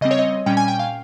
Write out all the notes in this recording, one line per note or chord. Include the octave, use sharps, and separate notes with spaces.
C#3 G3 C4 D#5
C#5
D#5
A#2 G3 C#4 G5
G#5
G5
F5